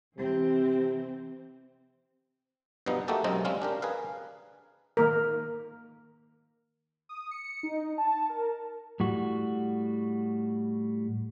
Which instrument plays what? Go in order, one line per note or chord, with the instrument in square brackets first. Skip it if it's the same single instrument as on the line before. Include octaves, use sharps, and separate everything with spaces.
[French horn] C3 [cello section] E3 C4
[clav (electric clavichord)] G2 B2 F3 B3 D#4
A3 A#3 D#4 F#4 G4 A4
B1 F#2 C3 G#3 C4 D#4
G3 G#3 C4 C#4 F5
D4 G4 A#4
G#4 A#4 B4 F5
[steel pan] D#3 A#3 A#4
[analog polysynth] D#6
C#7
D#4
A5
A#4
[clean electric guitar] A2 G3 F#4